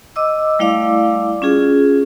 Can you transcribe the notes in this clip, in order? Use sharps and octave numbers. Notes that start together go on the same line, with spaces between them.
D#5 D6 E6
G3 A3 E4 D5 F5 D6
C#4 F4 G#4